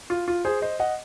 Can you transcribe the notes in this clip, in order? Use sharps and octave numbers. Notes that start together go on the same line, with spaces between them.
F4
F4
G#4 C5
C5 D#5
D#5 F#5